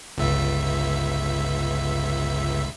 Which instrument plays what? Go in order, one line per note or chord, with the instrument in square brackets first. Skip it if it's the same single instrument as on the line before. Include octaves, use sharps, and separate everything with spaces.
[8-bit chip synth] G1 C#2 E5